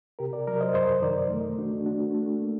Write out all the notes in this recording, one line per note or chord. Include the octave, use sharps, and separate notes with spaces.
C3 G4 A#4
A#4 D5
F#3 A#4 D5
C5 D#5
F#2 C5 D#5
D#3 A#4 D5
A3
A3 D4 F#4
A3 D4 F#4
A3
A#3